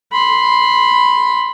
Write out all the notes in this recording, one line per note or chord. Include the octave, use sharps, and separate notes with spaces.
B5 C6